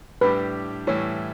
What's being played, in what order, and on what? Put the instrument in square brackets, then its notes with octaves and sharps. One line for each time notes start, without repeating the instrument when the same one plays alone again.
[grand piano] A2 G3 D4 G4 [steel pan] B4
[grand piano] A2 E3 G3 [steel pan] C#5